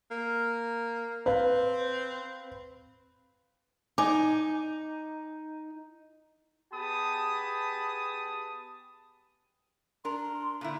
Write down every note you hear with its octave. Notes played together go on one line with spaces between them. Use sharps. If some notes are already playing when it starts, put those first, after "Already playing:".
A#3
C4 B4 F5
D#4 D5 G#5 D6
B3 G4 G#4 A5 B5 D#6
D4 A#4 C6
A#2 D3 E4